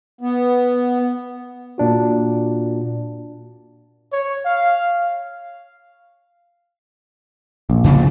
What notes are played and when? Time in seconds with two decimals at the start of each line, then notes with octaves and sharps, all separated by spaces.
0.21 B3
1.78 A#2 D4 F#4
4.12 C#5
4.45 F5
7.70 A#1
7.84 G#2 C#3 D4